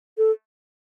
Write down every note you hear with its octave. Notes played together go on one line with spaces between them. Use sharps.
A4